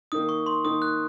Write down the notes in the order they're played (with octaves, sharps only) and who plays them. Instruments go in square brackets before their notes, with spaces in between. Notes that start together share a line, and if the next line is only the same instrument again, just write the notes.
[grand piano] D#3 A#3 D#4 [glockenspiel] D#6
[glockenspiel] C#6
C6
[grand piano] D#3 A#3 D#4 [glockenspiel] D#6
[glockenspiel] F#6